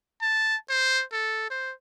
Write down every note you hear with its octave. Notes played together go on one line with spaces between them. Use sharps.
A5
C5
A4
C5